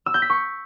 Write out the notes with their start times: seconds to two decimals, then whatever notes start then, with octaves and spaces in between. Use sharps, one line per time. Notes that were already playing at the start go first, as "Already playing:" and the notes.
0.06 E6
0.14 G6
0.22 B6
0.30 C#6